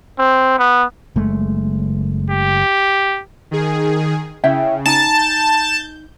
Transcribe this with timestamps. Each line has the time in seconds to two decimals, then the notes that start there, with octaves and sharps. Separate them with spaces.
0.19 C4
0.59 B3
1.16 F#1 G#3 A3
2.30 G4
3.51 D#3 G#4
4.43 C#3 E4 E5 G5
4.86 D#4 G#5 A5
5.17 G6